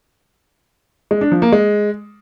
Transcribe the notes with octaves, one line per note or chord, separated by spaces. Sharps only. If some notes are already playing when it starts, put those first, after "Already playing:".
G#3
D4
F3
A#3
G#3